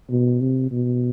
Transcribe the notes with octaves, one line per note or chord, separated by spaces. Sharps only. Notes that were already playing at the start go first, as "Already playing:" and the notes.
B2
C3
B2